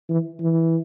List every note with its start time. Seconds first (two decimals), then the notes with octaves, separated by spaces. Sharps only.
0.09 E3
0.40 E3